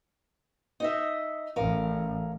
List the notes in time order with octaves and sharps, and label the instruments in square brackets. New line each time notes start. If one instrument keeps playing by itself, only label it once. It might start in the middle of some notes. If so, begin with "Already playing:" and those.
[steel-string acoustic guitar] D#4 D#5 E5
[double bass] A1 [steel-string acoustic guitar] C#4 A#4 F5